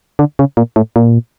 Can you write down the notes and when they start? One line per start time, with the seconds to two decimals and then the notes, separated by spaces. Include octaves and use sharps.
0.19 D3
0.39 C#3
0.57 A#2
0.76 A2
0.96 A#2